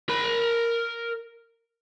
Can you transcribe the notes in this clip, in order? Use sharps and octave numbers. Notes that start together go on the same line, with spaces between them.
A#4 B5